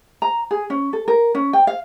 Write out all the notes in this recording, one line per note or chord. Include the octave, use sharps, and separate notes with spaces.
A#5
G#4
C#4
A4
A#4
C#4
G5
F5